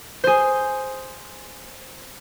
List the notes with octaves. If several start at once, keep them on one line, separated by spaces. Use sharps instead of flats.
G#4 C5